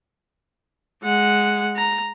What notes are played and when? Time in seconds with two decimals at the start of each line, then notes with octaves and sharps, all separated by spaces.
1.03 G#3 F#5
1.77 A#5